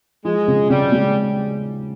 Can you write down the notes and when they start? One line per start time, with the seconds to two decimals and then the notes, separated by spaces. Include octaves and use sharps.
0.25 F3 G#3
0.48 C#3
0.70 C#3 G3
0.92 G#3